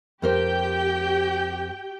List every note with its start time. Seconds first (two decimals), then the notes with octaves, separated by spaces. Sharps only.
0.22 F2 G4 A#4 C5 G5